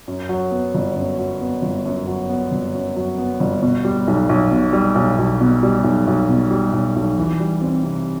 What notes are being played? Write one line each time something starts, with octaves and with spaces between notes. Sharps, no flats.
F#2
F#3
B3
G1
F#2
F#3
B3
G1
F#2
F#3
B3
G1
F#2
F#3
B3
G1
B2
G3
B1
B1
B2
G3
B1
B1
B2
G3
B1
B1
B2
G3
B1
B1
E3
G3
C4
C3